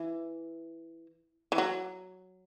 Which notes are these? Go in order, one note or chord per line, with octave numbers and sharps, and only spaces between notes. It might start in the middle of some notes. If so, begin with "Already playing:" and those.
Already playing: E3
E3
F#3